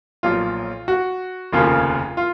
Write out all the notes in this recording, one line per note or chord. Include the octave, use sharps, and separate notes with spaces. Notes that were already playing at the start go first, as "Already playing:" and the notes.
B1 A#2 F3 A#3 F4
F#4
F1 D#2 C#3 F3 F4
F4